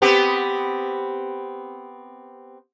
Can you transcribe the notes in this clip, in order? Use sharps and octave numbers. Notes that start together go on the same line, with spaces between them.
B3 C4 G4